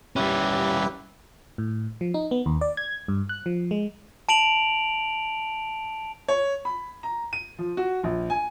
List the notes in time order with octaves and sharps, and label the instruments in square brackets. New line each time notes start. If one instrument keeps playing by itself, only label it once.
[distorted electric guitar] G3 C#4 [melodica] E4 G4 B4
[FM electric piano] A2
F3
D#4
B3
D#2
D5
G#6
G2
F#6
F3
G#3
[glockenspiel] A5 D7 F7 F#7
[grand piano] C#5
B5
A#5
D#7
F3
F#4
A#1
G#5